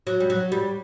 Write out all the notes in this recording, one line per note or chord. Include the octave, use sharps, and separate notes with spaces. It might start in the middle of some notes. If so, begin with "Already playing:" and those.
F#3
G3
F#3
G3